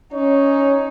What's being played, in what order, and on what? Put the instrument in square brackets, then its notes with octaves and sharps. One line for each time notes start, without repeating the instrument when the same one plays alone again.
[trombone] C#4 [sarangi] D#4 [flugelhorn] C#5